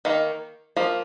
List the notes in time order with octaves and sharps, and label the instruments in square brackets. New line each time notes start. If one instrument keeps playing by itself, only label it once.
[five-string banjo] D#3 A#3
F3 A#3